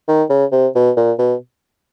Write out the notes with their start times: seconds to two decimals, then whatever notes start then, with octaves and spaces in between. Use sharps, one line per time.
0.08 D#3
0.30 C#3
0.52 C3
0.75 B2
0.97 A#2
1.19 B2